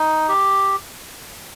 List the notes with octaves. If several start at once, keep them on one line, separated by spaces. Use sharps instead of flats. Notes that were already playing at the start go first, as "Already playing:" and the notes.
Already playing: D#4
G4